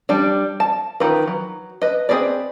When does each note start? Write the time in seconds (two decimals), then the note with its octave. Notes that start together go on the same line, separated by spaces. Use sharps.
0.09 G3 D4
0.60 A5
1.00 D#3 F4 B4
1.27 F#3
1.82 B4 D#5
2.09 C4 F#4 G#4 B4 D5